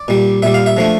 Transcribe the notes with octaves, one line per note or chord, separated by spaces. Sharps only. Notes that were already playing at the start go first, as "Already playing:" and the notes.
Already playing: D5
A#2 G3
A#2 G3 E5
F5
E5
D3 F3 A3